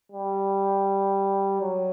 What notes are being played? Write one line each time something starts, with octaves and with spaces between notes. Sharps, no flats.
G3
F#3